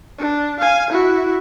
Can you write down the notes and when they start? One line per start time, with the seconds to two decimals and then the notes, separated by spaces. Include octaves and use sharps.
0.19 D4
0.60 F5 G#5
0.91 E4 F#4